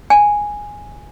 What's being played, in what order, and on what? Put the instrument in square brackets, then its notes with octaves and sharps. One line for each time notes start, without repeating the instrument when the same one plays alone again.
[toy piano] G#5